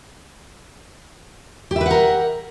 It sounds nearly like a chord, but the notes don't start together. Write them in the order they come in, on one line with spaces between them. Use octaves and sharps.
G4 E5 B4 F#5 A#4